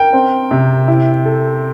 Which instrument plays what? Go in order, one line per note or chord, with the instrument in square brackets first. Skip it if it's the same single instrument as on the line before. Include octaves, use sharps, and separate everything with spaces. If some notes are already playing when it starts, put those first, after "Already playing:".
Already playing: [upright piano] A#4 [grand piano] G5
[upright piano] C4
C3
E4
A4